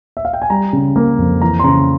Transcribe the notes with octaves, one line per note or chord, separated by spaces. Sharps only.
E5
F5
G5
G#5
G3 A#5
C#3
A#3
F2
E3 A#5
C6
C#3 A#5